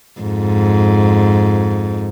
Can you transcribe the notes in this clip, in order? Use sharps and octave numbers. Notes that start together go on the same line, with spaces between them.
F2 G#2